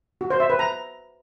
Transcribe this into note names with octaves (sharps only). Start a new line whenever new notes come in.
F#4
C5
E5
B4
A#5